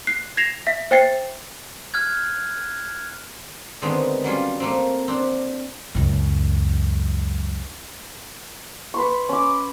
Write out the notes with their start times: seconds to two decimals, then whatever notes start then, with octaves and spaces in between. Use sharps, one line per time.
0.07 F#6 C7
0.37 G#6 A#6 C7 E7 F7
0.67 E5 B6
0.91 C5 E5 G5 G#6 A6 C7
1.94 F6 F#6 G#6
3.82 D3 D#3 G#3 A3 B3 C4
4.24 F#3 G3 C#4 F4
4.60 A3 A#3 C4
5.08 C4 D4
5.95 C#2 F#2
8.94 B4 C6 C#6
9.29 C#4 D6